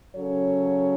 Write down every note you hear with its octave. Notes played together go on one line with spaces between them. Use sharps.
C#3 F#3 C#4 A4 C#5